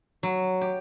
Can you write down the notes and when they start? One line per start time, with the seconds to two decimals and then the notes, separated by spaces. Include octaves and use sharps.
0.23 F#3
0.61 G4